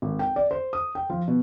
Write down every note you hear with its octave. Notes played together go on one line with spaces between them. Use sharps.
G#1
G5
D5
C5
D#6
G5
F3
B2